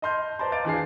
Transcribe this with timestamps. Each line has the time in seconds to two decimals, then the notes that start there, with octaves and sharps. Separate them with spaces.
0.02 D#5 A5 C6 F6 G6
0.39 B4 C5 D5 A5 A#5 C6
0.52 D#5 F5 D6 G6 A6 D7
0.65 E2 D4 G#4 C7